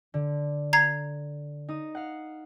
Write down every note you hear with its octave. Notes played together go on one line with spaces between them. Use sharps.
D3
A#5 G#6 C7
D#4 D#6
F5 F#5